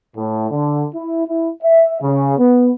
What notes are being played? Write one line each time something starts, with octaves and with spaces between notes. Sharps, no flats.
A2
D3
E4
E4
E5
C#3
B3